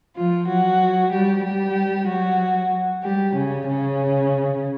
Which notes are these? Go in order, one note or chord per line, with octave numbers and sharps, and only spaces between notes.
F3 F4
F#3 F#4
G3 G4
G3 G4
F#3 F#4
G3 G4
C#3 C#4
C#3 C#4